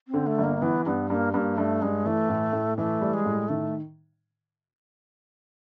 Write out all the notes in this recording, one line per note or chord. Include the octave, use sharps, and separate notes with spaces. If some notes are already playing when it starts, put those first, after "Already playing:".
C4
D3
A3
G1
A#3
E3 B3
G2 B3
G2 A#3
G2 A#3 B3
G2 A3
G2 G#3
E3 A3
A2
A2
E3 A3
G3
G#3
A2
D#3 A3